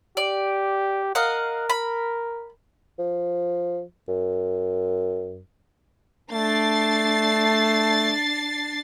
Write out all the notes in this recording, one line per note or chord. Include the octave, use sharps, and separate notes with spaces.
G4 D5
A#4 D#5 F5 F#5
B5
F3
F#2
A3 D4 A6 C7